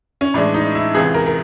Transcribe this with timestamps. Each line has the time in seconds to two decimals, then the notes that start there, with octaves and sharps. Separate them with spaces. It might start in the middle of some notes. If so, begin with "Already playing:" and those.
0.21 C#4
0.34 A2 E3 G#3 D4
0.54 D#4
0.75 E4
0.94 C#2 C3 E3 G#4
1.14 A#4
1.27 A#4